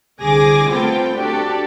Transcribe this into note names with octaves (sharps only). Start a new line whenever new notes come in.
C2 D3 G#4 G#5 D6 A#6
A3 B3 C4 F4 A4 G5
D4 F#4 G4 A4 D5